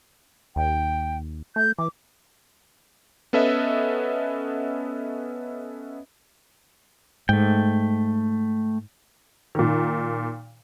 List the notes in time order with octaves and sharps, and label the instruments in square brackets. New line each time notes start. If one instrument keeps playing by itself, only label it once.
[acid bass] D#2 [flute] G5
[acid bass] A3 [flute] G6
[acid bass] E3 [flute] D6
[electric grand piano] B3 C#4 A4 B4 D#5 E5
[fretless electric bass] G#2 [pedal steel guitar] A3 G5
[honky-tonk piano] A#2 D#3